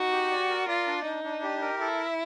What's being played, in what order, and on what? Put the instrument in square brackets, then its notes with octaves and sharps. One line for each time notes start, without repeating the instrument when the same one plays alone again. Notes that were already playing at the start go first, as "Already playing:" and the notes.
Already playing: [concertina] D#4 [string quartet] F#4
[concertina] G4
D5
A#4
[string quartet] F4 [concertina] D5
[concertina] D4
[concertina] D4 [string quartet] D#4
[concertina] D4
G4
A#4
[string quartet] E4 [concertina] A4
[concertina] E5